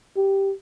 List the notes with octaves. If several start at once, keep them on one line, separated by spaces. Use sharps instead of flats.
G4